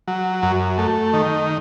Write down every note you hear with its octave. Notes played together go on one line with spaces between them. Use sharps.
F#3
F#2
A3
D#3